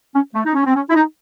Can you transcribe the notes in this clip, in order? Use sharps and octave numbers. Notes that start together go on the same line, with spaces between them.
C#4
A3
D#4
C#4
C4
C#4
E4
D#4